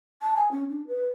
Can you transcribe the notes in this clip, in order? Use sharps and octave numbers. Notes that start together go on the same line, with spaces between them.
A5
G#5
C#4
D4
B4